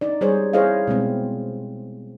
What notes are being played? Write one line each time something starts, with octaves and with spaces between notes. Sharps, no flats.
D#4 D5
G3 G#4 C5 C#5
E4 G#4 C5 C#5 D#5 F5
B2 G#3 C4